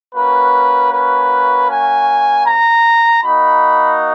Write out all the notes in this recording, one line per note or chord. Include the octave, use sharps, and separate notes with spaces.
A#3 C#4 F#4 B4
B4
G#5
A#5
A#3 D#4 F#4 B5